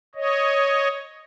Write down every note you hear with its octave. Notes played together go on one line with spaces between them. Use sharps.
C#5 D#5